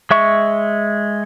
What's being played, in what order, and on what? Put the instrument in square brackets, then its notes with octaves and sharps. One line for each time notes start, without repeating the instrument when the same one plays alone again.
[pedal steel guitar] G#3 E5 C#6